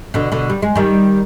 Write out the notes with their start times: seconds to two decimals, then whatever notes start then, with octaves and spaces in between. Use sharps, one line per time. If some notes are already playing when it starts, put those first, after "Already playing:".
0.14 B2 D3
0.32 B2 D3
0.50 G3
0.62 G#3
0.75 D#3 G3